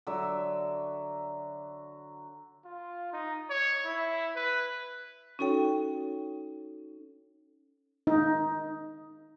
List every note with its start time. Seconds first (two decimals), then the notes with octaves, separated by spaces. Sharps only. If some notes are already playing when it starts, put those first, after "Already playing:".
0.07 D3 F#3 E5
2.65 F4
3.13 D#4
3.50 C#5
3.85 E4
4.36 B4
5.39 C#4 D#4 F#4 A4 C#5 G5
8.07 D#4